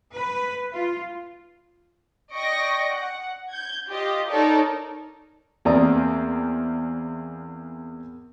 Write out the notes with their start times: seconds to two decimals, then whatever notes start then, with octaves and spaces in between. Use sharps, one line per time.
0.14 B4
0.73 F4
2.34 D5 D#5 G5 C#6 A#6 D7
2.91 F#5
3.51 G6 G#6
3.88 F4 G4 D#5
4.28 D#4 A4 A#4 C#5 D5
5.65 E2 A#3 C4 D5 A#5 D#6